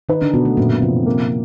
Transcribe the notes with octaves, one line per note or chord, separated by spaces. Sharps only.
D#3 D#4 B4
D3 D4
B2 B3 F#4
A3
F#2 A#2 A#3
B3
C3 F3 C4
A#3